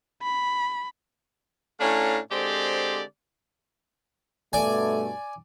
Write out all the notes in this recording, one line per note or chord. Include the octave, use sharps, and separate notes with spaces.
B5
A2 A3 C#4 D4 F5 A#5
D3 G#3 C4 G4 C5 D5
G2 B2 A3 D5 G#5